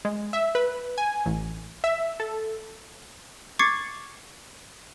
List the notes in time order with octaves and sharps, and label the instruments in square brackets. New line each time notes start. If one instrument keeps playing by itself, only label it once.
[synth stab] G#3
E5
B4
G#5
A1
E5
A4
[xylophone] C#6 D6 G#6 A6 C7 C#7